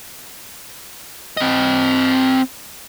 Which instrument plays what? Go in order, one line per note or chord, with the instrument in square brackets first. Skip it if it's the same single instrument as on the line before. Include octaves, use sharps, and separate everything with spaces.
[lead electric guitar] C4 D#5